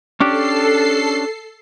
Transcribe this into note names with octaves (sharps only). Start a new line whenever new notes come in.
C#4 D4 G4 A4 C7